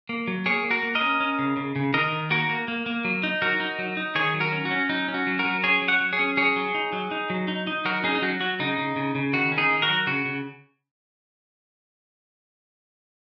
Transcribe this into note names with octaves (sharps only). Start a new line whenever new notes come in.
A#3
F#3
A#3 G#4 C#5
A#3
F#4 A#4
A#3
A#4 D#5
C#4
C#4
C#3
C#3
C#3
D#3 A#4 D#5
D#3
A#3 F#4 A#4
A#3
A#3
A#3
F#3
D#4
F#3 F#4 A#4
D#4
F#3
D#4
D#3 G#4 C#5
F#3
F#4 A#4
C#4
F#4
C#4
F#3 D#4
C#4
F#4
F#3
F#4 A#4
F#3
C#4 G#4 C#5
F#3
C#5 F#5
F#3
G#4 C#5
C#4
F#3 G#4 C#5
F#3
D#4
F#3
D#4
F#3
D#4
D#4
F#3 F#4 A#4
C#4 D#4 G#4
D#4
F#3 F#4
F#3 F#4
C#3 D#4
C#3
C#3
C#3
D#3 F#4
C#4
D#4 G#4
D#3
F#4 A#4
F#3
C#3 F#4
C#3